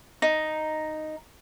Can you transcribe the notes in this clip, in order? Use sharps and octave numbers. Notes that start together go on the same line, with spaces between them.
D#4